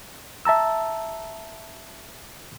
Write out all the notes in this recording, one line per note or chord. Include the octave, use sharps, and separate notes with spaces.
E5 A5 A#5 E6